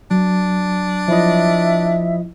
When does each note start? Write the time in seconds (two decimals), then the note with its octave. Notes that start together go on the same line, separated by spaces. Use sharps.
0.11 F#3 D4
1.08 F3 E4 D#5 E5